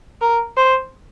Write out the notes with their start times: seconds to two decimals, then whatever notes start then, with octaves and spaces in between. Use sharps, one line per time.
0.22 A#4
0.57 C5